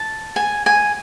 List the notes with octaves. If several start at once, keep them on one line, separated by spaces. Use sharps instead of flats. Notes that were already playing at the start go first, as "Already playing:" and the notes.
Already playing: A5
G#5
G#5